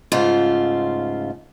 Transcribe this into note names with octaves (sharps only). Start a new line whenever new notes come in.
G#2 C#3 A3 F4